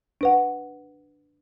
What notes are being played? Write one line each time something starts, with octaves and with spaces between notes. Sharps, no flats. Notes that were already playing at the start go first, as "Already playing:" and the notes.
D4 B4 F#5